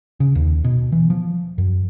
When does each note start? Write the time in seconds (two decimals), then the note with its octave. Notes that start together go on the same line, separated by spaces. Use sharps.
0.20 C#3
0.35 D#2
0.64 B2
0.92 E3
1.10 F3
1.58 F#2